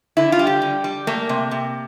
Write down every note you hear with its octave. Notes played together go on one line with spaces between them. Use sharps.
D3 E4
F4
G3
G4
D3
G3
A3 A#3
C3
C3